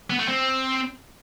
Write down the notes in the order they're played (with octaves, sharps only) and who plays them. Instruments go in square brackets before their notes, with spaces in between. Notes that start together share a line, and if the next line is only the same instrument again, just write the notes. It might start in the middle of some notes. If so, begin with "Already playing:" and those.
[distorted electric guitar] B3
A3
C4